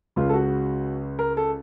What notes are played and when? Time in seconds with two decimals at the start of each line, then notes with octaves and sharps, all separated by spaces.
0.16 C#2 C#3 F4
0.29 A4
0.34 F#4
1.19 A#4
1.37 A4